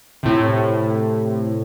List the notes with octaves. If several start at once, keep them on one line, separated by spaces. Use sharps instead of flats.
A2 C3